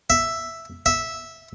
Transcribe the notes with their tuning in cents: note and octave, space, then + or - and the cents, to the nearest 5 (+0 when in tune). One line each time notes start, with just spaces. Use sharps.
E5 +0
E5 -10